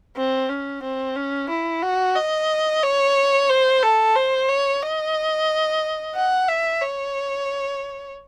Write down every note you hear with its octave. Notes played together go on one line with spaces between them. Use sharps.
C4
C#4
C4
C#4
E4
F#4
D#5
C#5
C5
A4
C5
C#5
D#5
F#5
E5
C#5